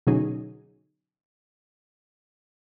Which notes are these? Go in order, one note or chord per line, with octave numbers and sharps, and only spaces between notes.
B2 D3 F#3 C#4 D#4 G#4